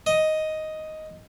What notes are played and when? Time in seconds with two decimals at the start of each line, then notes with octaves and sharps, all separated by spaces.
0.06 D#5